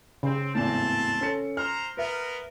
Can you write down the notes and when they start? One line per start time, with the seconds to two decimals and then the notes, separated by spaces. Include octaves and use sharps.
0.23 C#3 C4
0.55 G#1 E2 A2 C4 A5
1.21 C#4 A4 C#7
1.57 C5 A#5 F6
1.97 B3 A#4 B4 E5